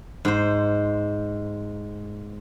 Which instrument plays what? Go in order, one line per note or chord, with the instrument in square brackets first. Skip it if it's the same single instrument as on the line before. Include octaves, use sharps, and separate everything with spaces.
[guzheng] G#2 C5